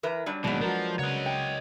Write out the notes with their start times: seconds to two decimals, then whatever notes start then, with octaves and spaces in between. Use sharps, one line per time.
0.03 E3 A#4 B4
0.26 F#3 G3 D4
0.44 D#2 B2 F#3 G#3 B3 D4
0.61 F3 F#4 A#4
0.99 C#3 C#5 D#5 F#5
1.26 G5